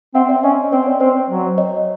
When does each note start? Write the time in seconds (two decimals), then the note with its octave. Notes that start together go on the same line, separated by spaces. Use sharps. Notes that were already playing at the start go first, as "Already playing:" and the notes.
0.15 C4 E5 F#5
0.29 D5 E5
0.43 C#4 C#5 D#5
0.72 C4 C5 D5
0.87 C#5
1.00 C4 C5
1.30 F#3
1.58 C#5 D#5